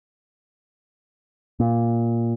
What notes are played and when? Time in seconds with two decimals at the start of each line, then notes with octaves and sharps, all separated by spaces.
1.60 A#2